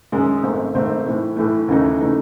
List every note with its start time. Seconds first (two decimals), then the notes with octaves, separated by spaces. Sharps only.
0.12 F#2 D#3 G#3
0.43 G#1 G#2 D#3 A3 C4
0.75 G#1 G#2 D#3 A3 C4
1.06 A2 E3 A3
1.37 A2 E3 A3
1.68 D#2 C#3 E3 A3 D#4
2.00 C#3 E3 A3 D#4